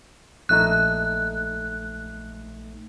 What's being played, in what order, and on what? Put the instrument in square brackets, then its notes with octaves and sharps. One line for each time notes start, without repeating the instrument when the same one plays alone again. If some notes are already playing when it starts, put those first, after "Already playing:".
[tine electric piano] A#1 A3 D#4 [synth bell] F#6